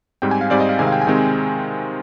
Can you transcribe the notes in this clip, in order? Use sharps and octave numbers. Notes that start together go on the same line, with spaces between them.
G#2 G3 C4 G5
G#5
F5
G#2 G3 C4 D5
D#5
F5
C3 D#3 G#3 C4 G#5
F5
G5
G#5
C3 D#3 G#3 C4 G5